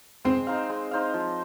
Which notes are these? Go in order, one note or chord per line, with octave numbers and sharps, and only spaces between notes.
G#3 C4
D#4 C5 F5
G#3
D#4 C5 F5
F3